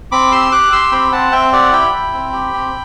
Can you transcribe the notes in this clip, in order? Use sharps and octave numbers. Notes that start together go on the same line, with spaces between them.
C4 B5 D6
G4 C6 E6
G4 D6 F#6
G4 C6 E6
C4 G5 B5
C4 F#5 A5
C4 E5 G5
G4 D5 F#5
E4 G5 B5
E4
C4
G4
C4